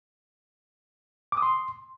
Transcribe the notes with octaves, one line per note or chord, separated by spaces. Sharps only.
D6
D#6
C6